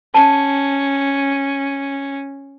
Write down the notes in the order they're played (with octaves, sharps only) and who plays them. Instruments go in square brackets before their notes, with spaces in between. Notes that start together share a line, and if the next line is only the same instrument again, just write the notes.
[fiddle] C#4 [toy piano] A5